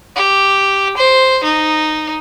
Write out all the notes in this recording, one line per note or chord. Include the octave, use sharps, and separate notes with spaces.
G4
C5
D#4